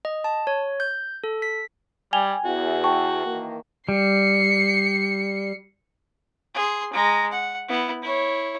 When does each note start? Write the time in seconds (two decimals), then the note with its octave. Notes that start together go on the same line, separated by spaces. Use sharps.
0.05 D#5
0.24 A5
0.47 C#5
0.80 G6
1.24 A4
1.42 B6
2.13 G3 G5 G#5 F7 G7
2.45 E2 F#4
2.84 G5 A5 C#6
3.25 D#3 E3 A#3
3.89 G3 C7 C#7
6.55 G#4 C6
6.93 G#3 A#5
7.31 F#5
7.69 B3 E4
8.02 E4 C#5